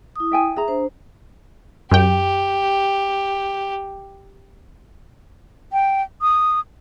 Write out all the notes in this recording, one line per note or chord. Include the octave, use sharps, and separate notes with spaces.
E4 D#6
E5 G5 G#5
G#4 E5 A#5
D4 C5
F#2 G4 G5
G5
D#6